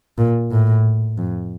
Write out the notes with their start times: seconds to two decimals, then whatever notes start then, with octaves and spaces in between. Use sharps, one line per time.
0.18 A#2
0.51 A2
1.18 F2